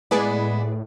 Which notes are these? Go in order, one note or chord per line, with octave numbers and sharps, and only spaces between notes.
A2 G#3 B3 E4 G#4 B4 D5